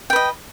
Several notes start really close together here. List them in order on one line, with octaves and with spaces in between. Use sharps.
G5 B4 D#5